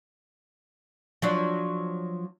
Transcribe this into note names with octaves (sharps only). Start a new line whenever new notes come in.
F3 F#3 D4